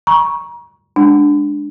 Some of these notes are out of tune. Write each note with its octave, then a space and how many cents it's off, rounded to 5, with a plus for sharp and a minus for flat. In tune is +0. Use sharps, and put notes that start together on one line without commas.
A#5 +35 C#6 +0
G#3 +0 D4 +0